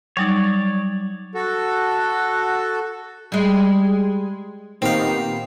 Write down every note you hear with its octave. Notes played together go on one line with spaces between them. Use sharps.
F#3 G3 D#4 C#5 D5
F#4 A4
G3 G#3
A#2 D#3 B3 C4 D#4 G4 F5